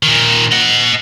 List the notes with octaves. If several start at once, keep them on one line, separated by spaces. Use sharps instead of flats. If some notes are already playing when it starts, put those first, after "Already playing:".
A#2 D#3
D#5 F#5